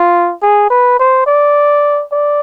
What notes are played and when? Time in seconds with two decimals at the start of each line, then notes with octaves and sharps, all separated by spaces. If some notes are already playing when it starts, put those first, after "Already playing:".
Already playing: F4
0.43 G#4
0.70 B4
0.99 C5
1.27 D5
2.12 D5